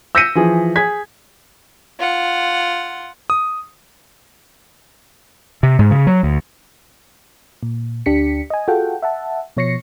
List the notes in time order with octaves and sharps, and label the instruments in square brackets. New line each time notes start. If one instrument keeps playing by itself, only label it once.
[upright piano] E6 G6 A#6 B6 C#7 D#7
E3 F3 G#4
G#4 G#6 B6
[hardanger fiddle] F4 F#5
[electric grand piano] D#6
[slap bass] C3
G#2
C#3
F#3
D2
[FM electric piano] A#2
D2 D4 G4 B6 C#7
D#5 G#5
F4 F#4 G#4 A4 F#5 G5
E5 F#5 A5
B2 F3 C#5 A#6 C7 C#7